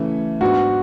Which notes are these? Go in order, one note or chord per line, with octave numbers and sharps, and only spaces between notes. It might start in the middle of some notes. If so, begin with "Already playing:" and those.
Already playing: C#3 E3 A3 C#4 E4
G#2 F#3 B3 D4 F#4